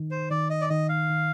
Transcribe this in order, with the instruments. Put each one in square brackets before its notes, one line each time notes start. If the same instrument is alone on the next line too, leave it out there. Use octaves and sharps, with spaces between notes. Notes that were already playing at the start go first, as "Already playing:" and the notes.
Already playing: [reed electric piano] D#3 D#4
[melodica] C5
[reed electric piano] D#3 [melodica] D5
[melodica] D#5
D5
[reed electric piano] D#3 [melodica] D#5
[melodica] F5
[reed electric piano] D#3